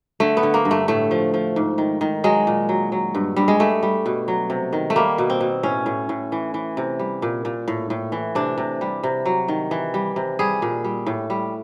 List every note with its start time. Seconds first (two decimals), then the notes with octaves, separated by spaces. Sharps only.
0.20 D3 A3
0.37 B3
0.43 D3
0.54 A#3
0.65 G2
0.71 A3
0.88 A2 A3
1.11 F3
1.34 F3
1.56 G#2
1.78 D#3
2.01 D#3
2.24 F#3 G#3
2.47 A#2
2.69 F#3
2.92 F#3
3.15 G2
3.36 G2 G3
3.48 G#3
3.60 G3 A3
3.83 G3
4.06 B2
4.28 F#3
4.50 C3
4.73 D#3
4.90 A3
4.96 G3 A#3
5.18 B2
5.30 C4
5.40 B2
5.63 A2 C#4
5.86 A2
6.09 A2
6.32 E3
6.54 E3
6.77 C3
6.99 G3
7.22 A#2
7.45 A#2
7.68 A2
7.90 A2
8.12 E3
8.35 C3 D4
8.58 C3
8.81 G3
9.03 C3
9.26 F#3
9.48 D#3
9.71 E3
9.94 G3
10.16 C3
10.39 G3 G#4
10.62 A#2
10.85 G3
11.07 A2
11.30 G3